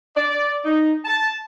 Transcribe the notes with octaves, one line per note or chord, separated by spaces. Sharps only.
D5
D#4
A5